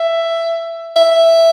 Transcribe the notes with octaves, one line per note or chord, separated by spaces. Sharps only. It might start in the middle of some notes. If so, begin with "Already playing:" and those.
Already playing: E5
E5